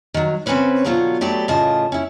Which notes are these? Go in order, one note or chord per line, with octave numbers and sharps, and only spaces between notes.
D#3 F#3
C#3 C4 C#4 A#4 B4 C#5
B2 D3 F#3 F4 F#4
F#3 A3 B3 G4 D5
A2 C#3 F4 D#5 A5
C#4 E4